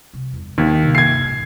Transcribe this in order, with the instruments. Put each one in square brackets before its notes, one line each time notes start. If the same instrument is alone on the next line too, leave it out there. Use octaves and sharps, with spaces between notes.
[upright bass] C3
E2 G2
[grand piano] D#2 [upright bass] B3
[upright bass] G2 C3
[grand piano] G#6 C7
[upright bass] C#2 A2